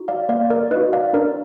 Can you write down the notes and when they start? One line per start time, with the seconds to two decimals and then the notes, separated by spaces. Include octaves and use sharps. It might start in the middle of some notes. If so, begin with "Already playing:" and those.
Already playing: D#4 F#4
0.08 D5 F5
0.29 A#3 D5 F5
0.50 A#4 D5
0.71 D#4 F#4 B4 D#5
0.93 D5 F5
1.13 D4 A#4 D5